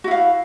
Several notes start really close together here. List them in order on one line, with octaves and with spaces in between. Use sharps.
F#4 E4 F5